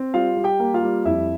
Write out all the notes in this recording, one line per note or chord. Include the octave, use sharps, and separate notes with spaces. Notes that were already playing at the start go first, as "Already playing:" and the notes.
Already playing: C4
G3 F4 F5
G3
G4 G5
A#3
F4 F5
G3
F2 E4 E5